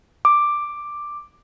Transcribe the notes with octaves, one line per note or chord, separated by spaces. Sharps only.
D6